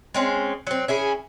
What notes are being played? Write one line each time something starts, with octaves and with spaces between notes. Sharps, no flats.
G#3 C4 C#4
F#3 C4
C#4 E4 G#4